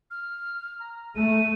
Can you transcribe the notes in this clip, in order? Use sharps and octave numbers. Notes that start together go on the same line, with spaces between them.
F6
A#5
A3 D#7